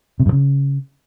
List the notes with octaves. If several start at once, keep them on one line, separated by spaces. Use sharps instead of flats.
C3
G2
C#3